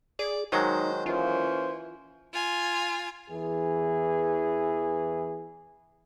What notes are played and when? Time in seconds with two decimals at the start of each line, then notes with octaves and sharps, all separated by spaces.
0.19 G#4 D5
0.52 D#3 F#3 G#3 D#4 C5
1.06 E3 A#3 C#4 F4 C5
2.34 F4 G#5
3.30 E2 E3 G#4